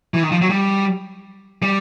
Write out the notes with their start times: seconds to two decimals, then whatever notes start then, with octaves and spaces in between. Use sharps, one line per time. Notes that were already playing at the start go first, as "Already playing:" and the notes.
0.14 E3
0.23 D#3
0.32 F3
0.41 F#3
0.50 G3
1.62 G3